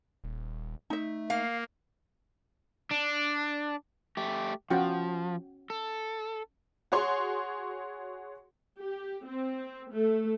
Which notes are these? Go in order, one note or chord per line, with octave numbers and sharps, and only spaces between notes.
D#1
A3 D#4 E5
A#3 F5
D4
A3 G4
F3 C#4 F#4 G5
A4
F#4 G#4 C#5 C6
G4
C4
A3